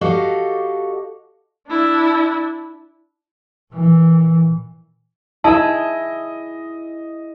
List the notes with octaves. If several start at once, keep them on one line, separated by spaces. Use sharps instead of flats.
F#4 G4 A4 D#5 F5
D4 E4
A#2 E3
E4 G#4 D#5 E5 A5